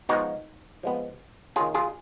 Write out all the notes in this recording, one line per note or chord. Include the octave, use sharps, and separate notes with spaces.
F3 G#3 B3 D#4 F#4
F3 G#3 B3
D#3 A#3 C#4 F4 G#4
F4 G#4